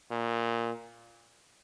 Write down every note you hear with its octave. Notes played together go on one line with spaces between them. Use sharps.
A#2